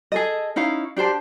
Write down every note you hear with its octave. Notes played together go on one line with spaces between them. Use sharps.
G#4 A4 D#5
C#4 D#4 E4 F5
D4 G4 C5 A5